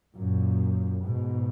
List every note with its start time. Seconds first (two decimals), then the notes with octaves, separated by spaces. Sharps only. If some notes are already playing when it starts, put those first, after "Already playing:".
0.16 F#2 A#2
1.03 G#2 B2